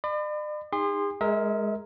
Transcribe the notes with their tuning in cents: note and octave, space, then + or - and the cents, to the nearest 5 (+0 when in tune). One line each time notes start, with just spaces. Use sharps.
D5 +45 B5 +35
D#4 +0 G#4 -40 C6 +0
G#3 +0 A#4 +0 E5 -35